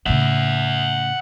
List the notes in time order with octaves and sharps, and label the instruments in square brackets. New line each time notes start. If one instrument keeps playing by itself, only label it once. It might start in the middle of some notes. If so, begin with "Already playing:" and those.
[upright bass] A2 C#3 [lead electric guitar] E5 F#5